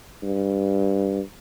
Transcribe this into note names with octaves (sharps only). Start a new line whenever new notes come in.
G2